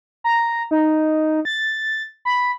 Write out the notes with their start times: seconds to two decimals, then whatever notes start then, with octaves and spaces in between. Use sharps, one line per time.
0.24 A#5
0.71 D#4
1.45 A6
2.25 B5